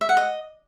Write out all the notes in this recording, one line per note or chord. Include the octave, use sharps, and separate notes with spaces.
E5
F#5
D#5